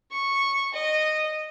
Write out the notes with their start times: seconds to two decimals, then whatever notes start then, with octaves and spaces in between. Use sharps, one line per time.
0.11 C#6
0.74 D#5